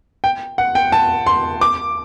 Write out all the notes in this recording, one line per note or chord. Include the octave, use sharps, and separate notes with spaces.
G5
F#5
G5
A5
C6
D6